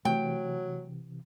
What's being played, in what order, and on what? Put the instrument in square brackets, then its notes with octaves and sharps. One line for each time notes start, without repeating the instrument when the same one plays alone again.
[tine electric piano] C3 E3 [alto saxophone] F#3 [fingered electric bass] A3 [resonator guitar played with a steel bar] G5